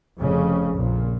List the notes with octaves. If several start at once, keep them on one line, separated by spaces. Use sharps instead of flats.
F1 F2 C#3
A#1 A#2